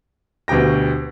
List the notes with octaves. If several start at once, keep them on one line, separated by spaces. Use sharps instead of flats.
D2 B2 G4 G5 A#6